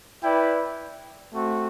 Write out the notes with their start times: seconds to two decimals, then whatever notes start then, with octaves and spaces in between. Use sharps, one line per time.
0.23 E4 B4 D5 G5
1.32 A3 C4 F#4